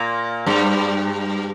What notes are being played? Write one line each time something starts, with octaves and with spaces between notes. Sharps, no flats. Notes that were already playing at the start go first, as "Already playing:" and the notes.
Already playing: A#2 A#3
G2 G3